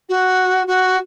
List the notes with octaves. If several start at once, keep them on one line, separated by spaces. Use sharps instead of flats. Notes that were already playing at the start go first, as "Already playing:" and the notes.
F#4
F#4